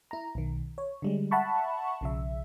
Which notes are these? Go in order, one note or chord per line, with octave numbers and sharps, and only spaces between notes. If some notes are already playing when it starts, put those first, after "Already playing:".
E4 A#5
B1 D#3
C#5
D3 G3 G#3
E5 F#5 A5 B5 C#6
B1 C#3 F3 E5